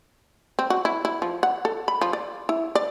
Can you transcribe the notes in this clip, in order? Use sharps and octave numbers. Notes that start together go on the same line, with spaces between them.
C4
F#4
E4
E4
F3
F#5
A4
B5
F3
D5
E4
D5